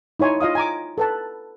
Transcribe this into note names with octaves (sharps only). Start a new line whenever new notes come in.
D#4 E4 C#5 G#5 C6
F4 D#5 F5 D#6
G#5 A#5 D6
A4 B4 A5